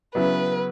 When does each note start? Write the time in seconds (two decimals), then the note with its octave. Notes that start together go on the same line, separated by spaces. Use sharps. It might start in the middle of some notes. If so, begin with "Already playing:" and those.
0.15 C#3 F#3 B3 E4 B4